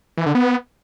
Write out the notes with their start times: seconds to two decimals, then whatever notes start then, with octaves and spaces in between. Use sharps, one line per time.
0.18 E3
0.26 D3
0.35 B3